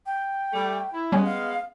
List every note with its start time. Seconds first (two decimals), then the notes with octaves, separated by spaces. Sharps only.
0.06 G5
0.53 G3 A3
0.92 E4
1.12 G3 G#3 B3 C#4 G#5
1.25 F5